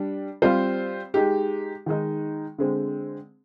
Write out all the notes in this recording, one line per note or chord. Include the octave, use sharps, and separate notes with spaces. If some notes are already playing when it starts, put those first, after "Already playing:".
Already playing: G3 D4
G3 C4 F4 C5
G#3 D#4 G4
D#3 G#3 D#4
D3 G#3 C4